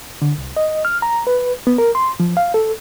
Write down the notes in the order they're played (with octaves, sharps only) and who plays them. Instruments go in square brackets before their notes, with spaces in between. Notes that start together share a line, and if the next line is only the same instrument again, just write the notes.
[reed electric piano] D3
C2
D#5
F6
A#5
B4
B3
A#4
C6
F3
F5
A4